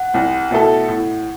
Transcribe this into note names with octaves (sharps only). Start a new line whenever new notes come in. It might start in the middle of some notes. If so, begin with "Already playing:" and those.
Already playing: F#5
C2
B2 A3 E4 A4
A2